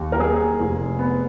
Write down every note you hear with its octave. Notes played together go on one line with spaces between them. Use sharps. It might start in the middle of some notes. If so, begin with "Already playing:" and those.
Already playing: D#2
A#4
A#3 G#4
F1
B3